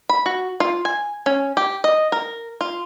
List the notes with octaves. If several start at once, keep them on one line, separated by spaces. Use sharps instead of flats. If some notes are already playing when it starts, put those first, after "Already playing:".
B5
F#4
F4
G#5
C#4
G4
D#5
A#4
F4